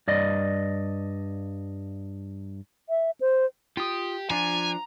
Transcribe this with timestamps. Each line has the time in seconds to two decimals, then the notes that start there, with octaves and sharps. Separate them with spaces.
0.08 G2 D5 D#5
2.89 E5
3.21 C5
3.77 F4 G4 D#6
4.30 F3 D4 F4 G#5 A#5